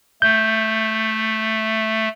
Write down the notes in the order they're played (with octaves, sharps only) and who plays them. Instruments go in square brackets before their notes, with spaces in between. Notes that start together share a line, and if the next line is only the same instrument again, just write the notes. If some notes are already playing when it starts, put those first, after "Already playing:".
[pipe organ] A3 [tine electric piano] G6